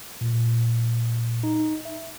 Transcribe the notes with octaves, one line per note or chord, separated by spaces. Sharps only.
A#2
D#4
E5